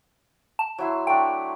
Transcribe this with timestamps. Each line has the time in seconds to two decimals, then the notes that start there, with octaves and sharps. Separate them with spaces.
0.59 A5
0.78 F#3 E4 C6
1.07 A3 D4 G5